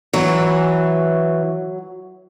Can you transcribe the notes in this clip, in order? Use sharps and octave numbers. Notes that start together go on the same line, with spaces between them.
E3 F#3